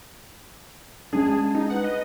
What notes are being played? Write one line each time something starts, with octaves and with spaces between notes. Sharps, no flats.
G#3 C#4 D4 G#4 A5
D#4
B4 F#5
D#5